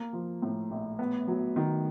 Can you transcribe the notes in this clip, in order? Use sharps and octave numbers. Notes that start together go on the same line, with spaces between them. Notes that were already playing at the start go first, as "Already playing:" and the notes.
Already playing: A#3
F3
A2
A#1
B3
F#3
D#3